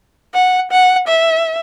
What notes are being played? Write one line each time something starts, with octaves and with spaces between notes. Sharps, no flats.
F#5
F#5
E5